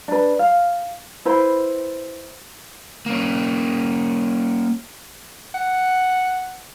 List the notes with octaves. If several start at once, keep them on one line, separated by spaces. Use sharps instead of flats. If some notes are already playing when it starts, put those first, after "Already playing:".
D4 B4
F5
E4 B4 C5 B5
A#3 C#4
F#5